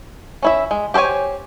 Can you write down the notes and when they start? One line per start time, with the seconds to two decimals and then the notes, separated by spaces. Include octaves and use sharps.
0.43 C#4 E4 E5
0.71 G#3
0.94 G4 A4 C5 C#5 G#5